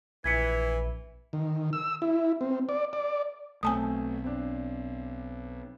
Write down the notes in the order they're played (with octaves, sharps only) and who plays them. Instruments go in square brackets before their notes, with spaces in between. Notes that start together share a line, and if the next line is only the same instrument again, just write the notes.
[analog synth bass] A#1 [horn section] E3 [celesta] G#6 B6 C#7
[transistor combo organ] D#3
E6
E4
C4
D5
D5
[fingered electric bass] B1 [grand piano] A3 C4 [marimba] G#5 A5 D#6
[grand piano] C4 D4